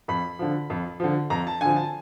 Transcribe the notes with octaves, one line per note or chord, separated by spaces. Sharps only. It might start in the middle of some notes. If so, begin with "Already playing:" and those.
F2 B5
D3 F3
F2
D3 F3
F2 A#5
A5
D3 F3 G#5
A5